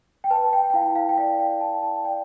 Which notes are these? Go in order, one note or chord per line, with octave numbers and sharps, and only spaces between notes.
G5
B4 A5
G5
G5
E4 F5
F5
G5
D5 F5
G5
E4 A5
A5
D5 G5